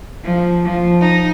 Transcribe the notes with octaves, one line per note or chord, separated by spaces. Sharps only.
F3
F3
D#4